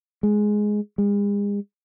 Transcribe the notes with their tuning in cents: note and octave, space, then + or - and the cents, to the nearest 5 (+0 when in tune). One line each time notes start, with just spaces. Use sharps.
G#3 +5
G#3 -40